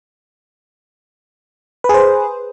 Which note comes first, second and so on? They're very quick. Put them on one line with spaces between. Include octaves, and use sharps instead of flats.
B4 G#4 C5